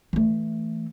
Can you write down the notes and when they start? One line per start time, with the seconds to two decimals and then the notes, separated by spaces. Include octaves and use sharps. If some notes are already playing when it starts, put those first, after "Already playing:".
0.13 E3 A3